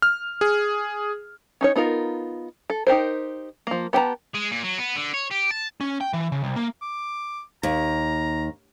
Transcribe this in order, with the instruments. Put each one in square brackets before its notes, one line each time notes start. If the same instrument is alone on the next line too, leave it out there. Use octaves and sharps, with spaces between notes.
[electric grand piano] F6
G#4
[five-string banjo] C#4 D#4 C#5
B3 D#4 F4 A#4
A4
D#4 G4 A#4 C5
F3 A#3
B3 G4 C5 A5 A#5
[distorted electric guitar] G#3
A#2
F#3
B3
D3
C#5
G4
A5
[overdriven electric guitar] C#4
G5
E3
C#3
C2
A#3
[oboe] D6
[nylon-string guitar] D#2 [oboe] A#5